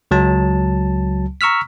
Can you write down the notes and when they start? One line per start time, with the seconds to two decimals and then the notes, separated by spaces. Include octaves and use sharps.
0.11 C#2 F#3 A5
1.41 A#5 C#6 E6 F6 B6